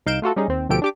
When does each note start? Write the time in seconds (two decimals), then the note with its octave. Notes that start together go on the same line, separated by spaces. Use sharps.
0.06 C2 D#4 F5 G6 D7 E7
0.22 A3 F4 F#4 A4
0.36 G3 C#4 D#4 G#4
0.48 D#2 C4
0.69 D2 B2 F3 G4 A4 D7
0.82 D4 G4 D6